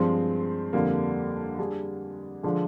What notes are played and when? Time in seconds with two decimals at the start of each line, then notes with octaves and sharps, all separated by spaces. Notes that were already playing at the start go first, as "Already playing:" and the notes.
Already playing: G2 F3 G#3 C4
0.73 F2 D3 G3 A#3
1.58 G3 D4 G#4
2.43 D3 F3 G#3 D4